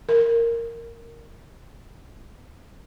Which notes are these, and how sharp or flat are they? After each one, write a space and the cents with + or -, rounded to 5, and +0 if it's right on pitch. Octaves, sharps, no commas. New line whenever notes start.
A#4 -10